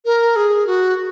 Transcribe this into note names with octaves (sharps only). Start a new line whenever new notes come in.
A#4
G#4
F#4